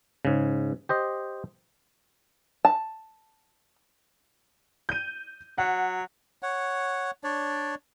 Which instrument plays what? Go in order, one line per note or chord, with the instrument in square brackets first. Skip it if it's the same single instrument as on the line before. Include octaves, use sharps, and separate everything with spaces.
[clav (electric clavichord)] G#2 C#3
G4 C5 D#5
[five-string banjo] A5
[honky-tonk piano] G6 D#7
[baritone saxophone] F#3 [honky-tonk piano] F#5
[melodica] C#5 F#5
D4 C#5 D5